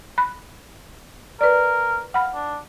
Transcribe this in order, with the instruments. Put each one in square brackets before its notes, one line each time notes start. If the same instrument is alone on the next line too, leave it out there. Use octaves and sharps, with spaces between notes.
[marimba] B5 F#6
[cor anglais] A#4 [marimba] B4 D5
[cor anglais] F5 [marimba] F#5 B5
[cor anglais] D4